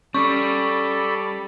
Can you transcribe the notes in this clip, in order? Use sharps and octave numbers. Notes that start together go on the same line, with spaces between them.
G3 C#4 A4 D5 B5 C#6